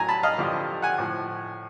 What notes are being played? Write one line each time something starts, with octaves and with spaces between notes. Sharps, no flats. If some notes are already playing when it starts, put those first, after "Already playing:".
Already playing: A2 F#3 G#5 A#5
A5 B5
D#5 F5
G2 D3 F3
F#5 G#5
A2 F3